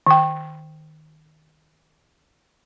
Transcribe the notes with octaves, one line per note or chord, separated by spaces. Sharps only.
D#3 G5